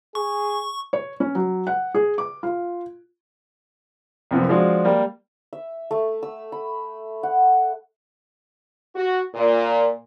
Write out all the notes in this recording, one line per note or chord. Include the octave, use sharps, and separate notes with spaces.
G#4 C#6
C#5
C#4
F#3
F#5
G#4
D6
F4
C2 F#2 F3 B3
F3 G#3 D4 F4 F#4
G3 A#3
E5
A3
E6
B5
F#5
F#4
A#2